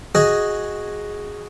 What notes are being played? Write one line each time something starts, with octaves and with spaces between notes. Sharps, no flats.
F#4 G#4 D#5